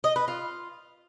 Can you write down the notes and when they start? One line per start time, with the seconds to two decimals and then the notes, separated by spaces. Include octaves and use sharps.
0.04 D#5
0.16 B4
0.28 F4